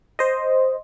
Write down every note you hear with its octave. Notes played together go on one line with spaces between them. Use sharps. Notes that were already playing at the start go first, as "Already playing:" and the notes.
C5 D#5